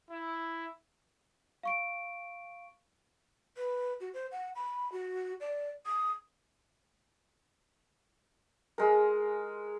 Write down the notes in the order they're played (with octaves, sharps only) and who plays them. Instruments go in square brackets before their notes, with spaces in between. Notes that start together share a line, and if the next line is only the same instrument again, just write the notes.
[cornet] E4
[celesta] F5 C#6 D7
[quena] B4
F#4
C5
F#5
B5
F#4
D5
D#6
[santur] G#3 A#4